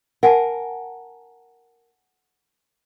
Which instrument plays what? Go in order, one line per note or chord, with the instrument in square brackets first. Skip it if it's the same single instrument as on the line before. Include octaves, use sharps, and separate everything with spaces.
[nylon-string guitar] A#4 [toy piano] F#5 G#5 A5